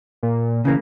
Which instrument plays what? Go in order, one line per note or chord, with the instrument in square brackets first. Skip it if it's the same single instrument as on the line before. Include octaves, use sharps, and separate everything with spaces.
[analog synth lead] A#2
[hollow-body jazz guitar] C#3 E3 A#3